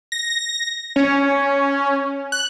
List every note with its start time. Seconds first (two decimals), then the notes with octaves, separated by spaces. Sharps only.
0.12 A#6
0.96 C#4
2.32 F#6